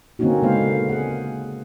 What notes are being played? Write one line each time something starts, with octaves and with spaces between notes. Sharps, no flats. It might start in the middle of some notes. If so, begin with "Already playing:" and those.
D3 A#3 C4 C#4 D#4 F#4
C#3 G#3 A#3 B3 C5 F5
G#4 F#5